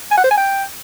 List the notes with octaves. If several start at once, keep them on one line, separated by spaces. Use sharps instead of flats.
G#5
F#5
C5
G#5
G5